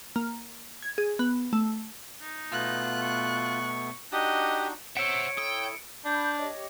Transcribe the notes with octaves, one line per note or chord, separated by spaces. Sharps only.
A#3
G#6
G#4
B3
A3
D#4
B2 A3 B3 F4 F#6
C#6
D4 D#4 F#4 G4 D#5 F#5
C5 C#5 E5 F#5 E6 C#7 D7
E4 A4 G5 D#6
D4 B5 G6
G4 C#5 D#5